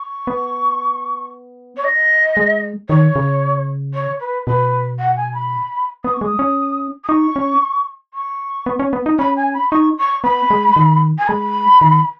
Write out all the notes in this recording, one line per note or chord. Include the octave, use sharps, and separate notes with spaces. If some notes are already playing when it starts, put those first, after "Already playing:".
Already playing: C#6
B3
C#5
D#5
G#3
D#3 C#5
C#3
C#5
B4
B2 B4
F#5
G#5
B5
B3 D#6
C#6
G#3 D#6
C#4
D#6
D#4 C#6
C#4
C#6
B3
C#4
B3
D#4
C#4 B5
G#5
B5
D#4 C#6
C#6
B3 B5
G#3
D#3
G#5
G#3 B5
D#3